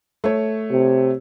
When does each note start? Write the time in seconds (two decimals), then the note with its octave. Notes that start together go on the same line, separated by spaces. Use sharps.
0.24 A3 C#5
0.72 C3